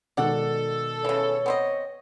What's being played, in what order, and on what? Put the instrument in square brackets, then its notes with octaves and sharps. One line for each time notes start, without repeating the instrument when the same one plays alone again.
[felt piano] B2 D#3 G#3 [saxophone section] A4 [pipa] D5 F#5
[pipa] C#3 E3 [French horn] C#5
[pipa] B3 C4 D#5